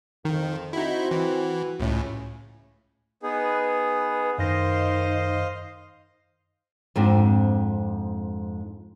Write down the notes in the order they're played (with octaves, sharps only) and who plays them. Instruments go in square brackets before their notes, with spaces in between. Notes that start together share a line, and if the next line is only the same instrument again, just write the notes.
[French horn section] F2 [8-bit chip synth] D#3
[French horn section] C4 F#4 [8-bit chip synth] D#4 E4
[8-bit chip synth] E3
[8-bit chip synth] C#2 A2 [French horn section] C#4
[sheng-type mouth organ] B3 D#4 G#4 [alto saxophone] B4
[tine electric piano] F#2 A#6 [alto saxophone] D#3 [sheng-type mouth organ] C5 D#5 F5
[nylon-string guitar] F2 G#2 C4 D4